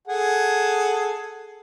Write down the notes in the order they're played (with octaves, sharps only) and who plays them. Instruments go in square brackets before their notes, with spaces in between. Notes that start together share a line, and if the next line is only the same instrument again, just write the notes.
[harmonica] G#4 A4 F#5